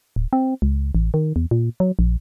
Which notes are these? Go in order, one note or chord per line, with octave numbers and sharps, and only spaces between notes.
D1
C4
C#2
A1
D#3
E2
A#2
F#3
A#1